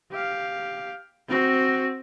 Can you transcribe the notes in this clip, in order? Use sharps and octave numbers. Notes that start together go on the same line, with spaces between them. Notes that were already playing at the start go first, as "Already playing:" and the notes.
G4 F5
C4 F#4